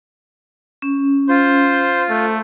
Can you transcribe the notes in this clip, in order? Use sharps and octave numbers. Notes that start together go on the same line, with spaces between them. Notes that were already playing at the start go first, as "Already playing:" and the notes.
C#4
F4 C5
A3 A4